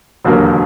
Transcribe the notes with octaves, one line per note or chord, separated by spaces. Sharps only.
E1 D#2 D3 F#3 A#3